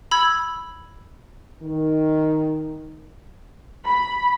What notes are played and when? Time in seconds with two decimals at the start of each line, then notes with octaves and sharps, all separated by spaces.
0.11 B5 E6 G#6
1.62 D#3
3.86 B5